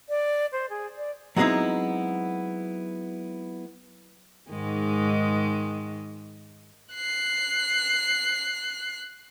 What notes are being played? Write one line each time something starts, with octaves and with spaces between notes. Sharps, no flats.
D5
C5
G#4
D5
F#3 G#3 B3 C4 D#4 E4
G#2 D#3 G#3
F#6 C7